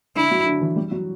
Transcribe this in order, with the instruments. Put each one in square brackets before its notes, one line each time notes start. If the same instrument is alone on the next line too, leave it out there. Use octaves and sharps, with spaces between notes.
[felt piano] D3 D4 [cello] E4
[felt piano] F#3 F#4
D3 D4
E3 E4
G3 G4
F#3 F#4